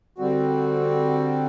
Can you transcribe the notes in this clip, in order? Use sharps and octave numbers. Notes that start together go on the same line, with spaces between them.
D3 G3 C4 F#4